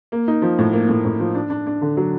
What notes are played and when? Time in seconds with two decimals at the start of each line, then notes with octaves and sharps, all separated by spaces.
0.12 A#3
0.28 D#4
0.42 F3
0.59 A2
0.73 A#3
0.89 A2
1.05 A2
1.20 F3
1.35 D4
1.50 D4
1.67 D4
1.81 D3
1.97 F#3